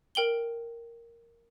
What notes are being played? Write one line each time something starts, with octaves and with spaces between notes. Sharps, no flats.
A#4 G5 F#7 G7